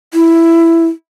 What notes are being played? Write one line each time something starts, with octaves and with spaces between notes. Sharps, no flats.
E4